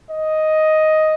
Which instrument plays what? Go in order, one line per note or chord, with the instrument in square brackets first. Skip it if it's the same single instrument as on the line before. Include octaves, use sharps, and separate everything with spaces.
[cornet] D#5